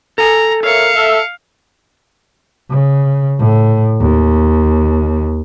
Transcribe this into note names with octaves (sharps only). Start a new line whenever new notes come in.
A4 G#5 A#5
A#4 C#5 E5 F5 C#7
A4 E5
C#3
A2
D#2